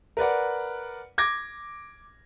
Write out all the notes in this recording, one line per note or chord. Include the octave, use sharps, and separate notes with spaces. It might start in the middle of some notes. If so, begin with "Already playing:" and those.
A#4 B4 D5 F#5
D6 G#6 A#6